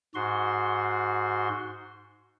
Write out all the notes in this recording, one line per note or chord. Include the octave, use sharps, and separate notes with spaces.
G#2 F#4 C6